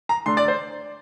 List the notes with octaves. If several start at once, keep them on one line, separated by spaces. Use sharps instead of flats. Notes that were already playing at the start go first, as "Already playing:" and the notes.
A#5
D3 A3 D4 C6
D5
C5